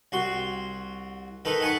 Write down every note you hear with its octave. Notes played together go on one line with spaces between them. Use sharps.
C2 F#4 C6
D#3 D#4 A4 B4
F#5 G#5 A5 B5 C#6